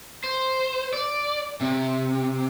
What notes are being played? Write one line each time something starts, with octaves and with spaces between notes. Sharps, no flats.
C5
D5
C3